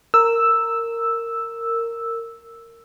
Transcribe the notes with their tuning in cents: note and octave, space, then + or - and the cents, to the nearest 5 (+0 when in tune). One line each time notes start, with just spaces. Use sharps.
A#4 -15 E6 +0